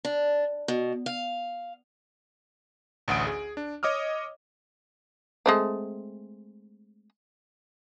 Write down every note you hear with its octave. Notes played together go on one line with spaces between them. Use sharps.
D4
B2
F5
A1 D2 F#5 D#6 D7
G#4
D4
C#5 D#5 D6 D#6 F6
G#3 A3 C4